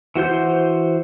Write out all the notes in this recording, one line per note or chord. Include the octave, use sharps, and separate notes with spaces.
E3 F#4 C5 G6